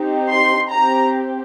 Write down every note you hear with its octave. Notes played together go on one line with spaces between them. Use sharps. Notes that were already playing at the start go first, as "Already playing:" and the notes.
Already playing: C4 D#4 G4
C6
C4 G4 A#5